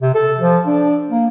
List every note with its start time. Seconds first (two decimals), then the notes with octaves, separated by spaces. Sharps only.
0.02 C3
0.14 A4
0.39 F3
0.67 D4
1.10 A#3